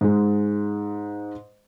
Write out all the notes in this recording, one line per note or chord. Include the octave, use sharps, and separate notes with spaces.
G#2 G#3